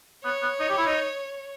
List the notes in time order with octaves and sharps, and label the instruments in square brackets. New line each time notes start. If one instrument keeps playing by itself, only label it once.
[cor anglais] B3 [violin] C#5
[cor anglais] B3
D#4
G4
E4
D#4